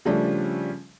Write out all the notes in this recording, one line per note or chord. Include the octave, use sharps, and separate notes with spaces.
C#3 F3 G3 A3 C#4 D4